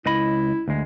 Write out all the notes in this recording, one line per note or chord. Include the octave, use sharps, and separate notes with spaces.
C#2 E4 D#5 B5
D2 G#3